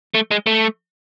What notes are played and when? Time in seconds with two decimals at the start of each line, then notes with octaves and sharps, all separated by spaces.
0.14 A3
0.31 G#3
0.47 A3